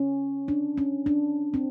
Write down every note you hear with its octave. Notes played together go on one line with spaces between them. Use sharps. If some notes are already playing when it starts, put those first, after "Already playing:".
Already playing: C#4
D4
C#4
D4
C4